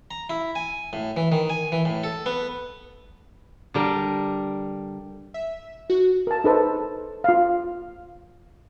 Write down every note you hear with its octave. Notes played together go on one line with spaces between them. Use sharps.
A#5
E4
G#5
A2
E3
D#3
G#5
E3
A2
A4
B3
D3 G3 A#4
E5
F#4
A#4 A5
D#4 A4 B4 C5
F4 F5